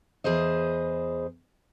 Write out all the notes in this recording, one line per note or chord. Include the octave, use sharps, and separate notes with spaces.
E2 G#4 B4 C5 D#5